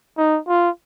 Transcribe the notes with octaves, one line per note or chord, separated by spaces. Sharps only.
D#4
F4